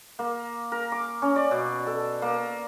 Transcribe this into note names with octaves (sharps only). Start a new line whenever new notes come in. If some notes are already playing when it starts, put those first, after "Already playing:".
A#3
A#4
D6
C#4
D5
B2
A4
A#3